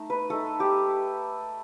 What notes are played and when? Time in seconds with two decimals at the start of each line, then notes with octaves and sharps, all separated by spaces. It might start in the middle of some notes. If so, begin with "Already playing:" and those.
Already playing: A3 D#4
0.10 B4
0.30 A3 D#4 A4
0.60 G4